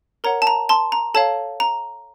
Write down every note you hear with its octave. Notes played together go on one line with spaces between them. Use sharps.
A#4 C#5 F#5 A#5
A5
A#5
A5 C6
A#5
A4 C#5 F5 A5
A#5